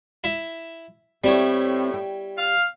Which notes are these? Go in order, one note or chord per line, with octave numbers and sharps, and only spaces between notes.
E4 E5
A2 G3 C4 E4 C#5 D5
G5
F5